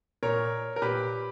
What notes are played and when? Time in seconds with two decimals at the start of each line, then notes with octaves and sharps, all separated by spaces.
0.23 A#2 A#4 C#5
0.76 A#4
0.82 A#2 G4 B4